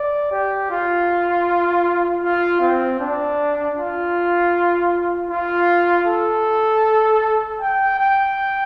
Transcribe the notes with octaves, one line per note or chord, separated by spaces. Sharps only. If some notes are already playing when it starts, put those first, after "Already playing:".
Already playing: D5
G4
F4
F4
C4
D4
F4
F4
A4
G5
G5